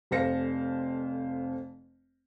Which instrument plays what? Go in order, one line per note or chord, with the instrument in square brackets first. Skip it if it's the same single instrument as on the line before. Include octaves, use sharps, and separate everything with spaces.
[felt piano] F1 F2 C5 F5 A#6 C#7